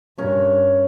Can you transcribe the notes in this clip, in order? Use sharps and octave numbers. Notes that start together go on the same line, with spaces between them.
G2 C#4 A#4